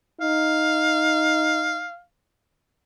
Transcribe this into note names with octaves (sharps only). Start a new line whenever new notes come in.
D#4 F5